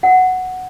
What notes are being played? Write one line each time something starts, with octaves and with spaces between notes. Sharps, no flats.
F#5